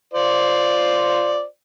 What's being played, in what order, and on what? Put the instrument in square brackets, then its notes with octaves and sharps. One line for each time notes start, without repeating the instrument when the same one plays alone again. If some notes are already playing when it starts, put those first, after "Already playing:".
[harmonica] F4 C5 D5